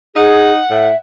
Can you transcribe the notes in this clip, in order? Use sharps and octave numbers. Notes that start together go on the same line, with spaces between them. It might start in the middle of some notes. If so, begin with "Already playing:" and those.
D#4 G#4 F#5
A2 E5